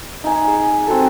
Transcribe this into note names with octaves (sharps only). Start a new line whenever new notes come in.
D#4 G#5
G#4
C4 F#4 A4